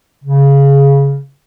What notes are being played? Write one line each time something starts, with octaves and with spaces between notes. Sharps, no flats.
C#3